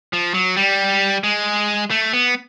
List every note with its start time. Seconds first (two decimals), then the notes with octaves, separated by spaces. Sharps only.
0.13 F3
0.34 F#3
0.56 G3
1.24 G#3
1.91 A3
2.13 B3